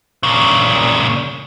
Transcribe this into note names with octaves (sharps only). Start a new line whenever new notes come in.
A#2 C#3